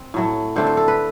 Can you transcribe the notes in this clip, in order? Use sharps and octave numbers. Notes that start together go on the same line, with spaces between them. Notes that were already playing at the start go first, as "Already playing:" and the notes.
Already playing: C4
A2 F#3 A3
D3 A3 C4 C5
C5
A4
B4